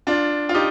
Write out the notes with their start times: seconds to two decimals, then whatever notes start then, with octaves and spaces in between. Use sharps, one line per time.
0.07 D4 F4
0.49 F4
0.54 D#4 G4